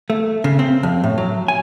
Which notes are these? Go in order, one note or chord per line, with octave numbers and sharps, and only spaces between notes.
A3
C#3
C4
F2
A2
F#3
G#5